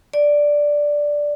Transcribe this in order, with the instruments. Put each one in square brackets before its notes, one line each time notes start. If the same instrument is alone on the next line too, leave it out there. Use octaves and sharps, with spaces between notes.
[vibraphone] D5